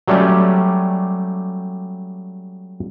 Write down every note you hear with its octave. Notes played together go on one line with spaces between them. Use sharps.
F#3 G3 A3 C#4 G4 D5